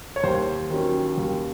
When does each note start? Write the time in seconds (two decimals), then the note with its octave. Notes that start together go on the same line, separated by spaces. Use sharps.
0.16 C#5
0.24 D#2 C5
0.70 D#3 F#3 C#4
1.18 D#2